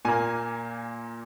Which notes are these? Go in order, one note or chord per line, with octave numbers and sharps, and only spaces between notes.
A#2 A#3 G#5